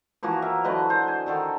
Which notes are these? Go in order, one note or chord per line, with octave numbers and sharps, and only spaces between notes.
E3 F3 A#3 F#4
A#4 E5
D3 F#3 B4 D#5
C5
G#5
D3 D#3 A4